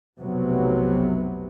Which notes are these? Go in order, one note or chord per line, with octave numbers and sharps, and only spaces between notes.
F1 B1 C3 F#3 B3